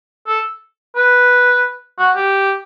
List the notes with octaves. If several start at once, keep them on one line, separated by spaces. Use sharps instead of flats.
A4
B4
F#4
G4